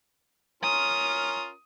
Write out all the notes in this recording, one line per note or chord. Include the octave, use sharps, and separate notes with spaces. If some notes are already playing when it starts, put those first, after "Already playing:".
C#4 F4 A#4 D#6